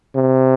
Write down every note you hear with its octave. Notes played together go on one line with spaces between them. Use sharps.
C3